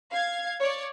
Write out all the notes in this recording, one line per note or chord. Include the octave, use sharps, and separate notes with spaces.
F5 G#6
C#5 D5